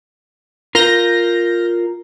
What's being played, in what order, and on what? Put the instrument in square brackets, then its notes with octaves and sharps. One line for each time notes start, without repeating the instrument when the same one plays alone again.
[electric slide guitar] F4 A#4 [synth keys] F6 G6 A#6